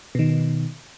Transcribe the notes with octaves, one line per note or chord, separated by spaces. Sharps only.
B2 D#3